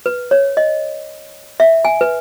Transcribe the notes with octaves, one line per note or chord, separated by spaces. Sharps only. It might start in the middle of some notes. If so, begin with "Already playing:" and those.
B4
C#5
D#5
E5
G#5
B4